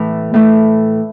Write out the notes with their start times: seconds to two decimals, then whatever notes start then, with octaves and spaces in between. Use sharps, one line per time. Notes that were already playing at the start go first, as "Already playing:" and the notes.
Already playing: A2 E3 A3
0.34 A2 E3 A3